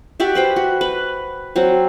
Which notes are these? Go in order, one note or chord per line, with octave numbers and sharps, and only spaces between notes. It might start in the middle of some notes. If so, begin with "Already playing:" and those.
F#4 G4 D5 E5
B4 C5 G5
F#4
B4
F#3 C4